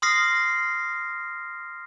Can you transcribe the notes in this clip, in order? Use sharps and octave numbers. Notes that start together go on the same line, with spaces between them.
C6 D#6 F6 A#6 C7